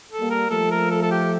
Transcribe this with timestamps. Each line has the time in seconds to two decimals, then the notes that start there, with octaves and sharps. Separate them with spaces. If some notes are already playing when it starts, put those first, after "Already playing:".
0.10 A4
0.20 G3 A#3
0.30 A#4
0.50 F3 A3 A4
0.71 A#4
0.91 A4
1.02 A4
1.11 G4